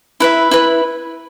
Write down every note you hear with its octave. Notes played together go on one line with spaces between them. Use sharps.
E4 B4 E5
E4 B4